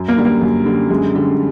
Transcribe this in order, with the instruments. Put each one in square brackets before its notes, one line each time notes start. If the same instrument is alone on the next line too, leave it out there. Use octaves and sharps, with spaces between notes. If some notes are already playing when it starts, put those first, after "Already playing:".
Already playing: [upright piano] F#2
[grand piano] A#3
[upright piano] D3 G3
[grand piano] A#3
[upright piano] F#2
D3 G3
[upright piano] F#2 [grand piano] G#3
[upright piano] D3 G3